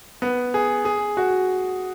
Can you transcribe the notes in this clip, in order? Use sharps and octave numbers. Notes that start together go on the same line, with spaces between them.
B3
G#4
G#4
F#4